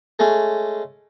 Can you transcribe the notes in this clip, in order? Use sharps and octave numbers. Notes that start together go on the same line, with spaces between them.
G#3 A3 C#4